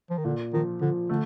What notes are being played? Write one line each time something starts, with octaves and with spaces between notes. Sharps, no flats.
F3
D#3
A#2 D3
D#3 F3
D3 F3
D3 A3